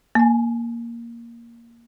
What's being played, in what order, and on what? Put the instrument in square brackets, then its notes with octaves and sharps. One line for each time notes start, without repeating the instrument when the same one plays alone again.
[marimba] A#3 G#5